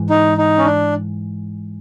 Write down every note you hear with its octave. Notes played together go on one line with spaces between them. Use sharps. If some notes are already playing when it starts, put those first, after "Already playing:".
Already playing: G#2 E3
D#4
D#4
C#4
D4